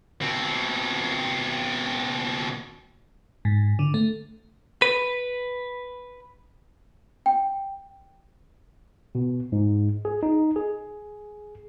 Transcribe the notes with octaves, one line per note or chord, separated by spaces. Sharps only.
B2 C4
G#2
D3
A3
B4
G5
B2
G#2
G#4
D#4
G#4